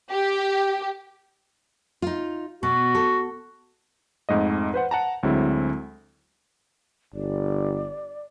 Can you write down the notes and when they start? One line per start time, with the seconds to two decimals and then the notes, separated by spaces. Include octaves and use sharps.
0.11 G4
2.02 D#4 F4
2.63 B2 F#4
2.95 A4
4.29 F2 G#2 A3 D#5
4.74 B4 C5 F#5
4.91 F#5 A5 A#5
5.23 D2 F#3 G#3 C4 E4
7.14 G1 D5